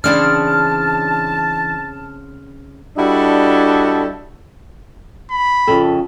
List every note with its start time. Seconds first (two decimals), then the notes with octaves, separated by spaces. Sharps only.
0.04 C#3 E3 C4 D4 E4 D5 A5 F6
2.98 G3 D4 E4 F#4 A4 D#5
5.31 B5
5.67 F2 C#3 A4